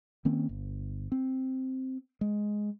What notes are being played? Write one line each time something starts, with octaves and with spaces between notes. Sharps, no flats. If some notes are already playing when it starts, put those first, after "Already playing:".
D#3 A#3 C4 C#4
G1
C4
G#3